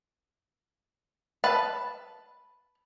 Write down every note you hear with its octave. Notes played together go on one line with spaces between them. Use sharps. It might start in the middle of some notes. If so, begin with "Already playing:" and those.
B4 A5